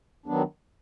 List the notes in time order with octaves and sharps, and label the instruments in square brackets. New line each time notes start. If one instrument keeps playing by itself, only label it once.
[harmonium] D#3 F#3 B3 D4